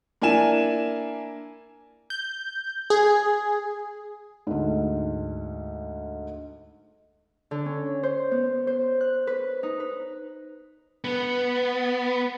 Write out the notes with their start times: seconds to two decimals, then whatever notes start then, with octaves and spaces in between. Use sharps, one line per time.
0.22 A#3 D4 E4 G#5 E7
2.10 G6
2.90 G#4
4.47 D2 G#2
7.51 D3
7.66 C#4
8.03 C5
8.31 B3
8.67 C5
9.01 F#6
9.27 B4
9.63 D#4
9.80 B4
11.04 B3